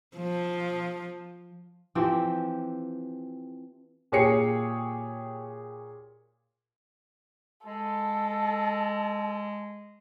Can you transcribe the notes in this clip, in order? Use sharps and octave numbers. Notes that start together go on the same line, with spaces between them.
F3
E3 F3 C4 G4
A#2 G4 G#4 C#5 C7 C#7
G#3 A4